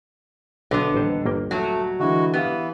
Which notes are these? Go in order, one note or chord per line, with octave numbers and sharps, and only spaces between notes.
B1 D3 B3
D#1 A1 D#3 A#4 C5
G1 A#3 G5
F#3 A3
D3 E3 G#3 E4 F#4
E3 B3 G4 F5